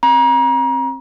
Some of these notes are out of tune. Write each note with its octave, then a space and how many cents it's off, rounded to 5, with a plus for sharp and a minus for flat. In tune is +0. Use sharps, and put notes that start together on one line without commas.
C4 +25 A#5 +35